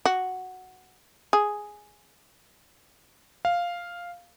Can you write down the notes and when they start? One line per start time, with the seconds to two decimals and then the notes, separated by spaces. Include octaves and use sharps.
0.05 F#4
1.33 G#4
3.45 F5